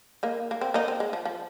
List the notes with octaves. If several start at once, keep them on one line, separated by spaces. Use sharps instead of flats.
A#3 D#4
A#3
C4
A#3 D#4
C4
G#3
F3
F3